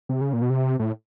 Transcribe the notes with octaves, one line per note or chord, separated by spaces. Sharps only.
C3
C#3
A#2
B2
C3
A2